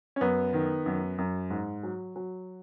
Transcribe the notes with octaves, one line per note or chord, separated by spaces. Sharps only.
C#4
F#2 B3
D#3
F#2
F#2
G#2
F#3
F#3